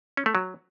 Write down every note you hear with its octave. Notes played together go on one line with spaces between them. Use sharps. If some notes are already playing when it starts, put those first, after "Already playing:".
C#4
A3
F#3